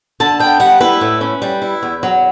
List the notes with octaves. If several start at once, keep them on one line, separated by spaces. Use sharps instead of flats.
D3 A5
B3 G5
G3 F#5
E4 B4
A2
C#4
G3
E4
E2
F#3